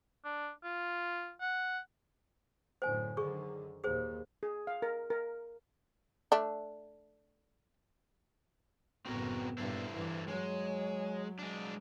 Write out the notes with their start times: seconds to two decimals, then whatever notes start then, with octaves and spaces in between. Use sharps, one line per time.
0.25 D4
0.64 F4
1.41 F#5
2.82 F#2 A2 D3 C5 G#5
3.17 F#2 D3 D#3 G#4 C#6
3.84 D#2 A#2 G#4 C5
4.43 G#4
4.67 F5
4.82 A#4
5.10 A#4
6.32 A3 D4
9.05 F#1 A2 B3 C4 F#4 A#4
9.58 G2 A#2 E4 A4 C5
9.93 G2 E3
10.28 F#3 G#3 C#5
11.39 G#3 D4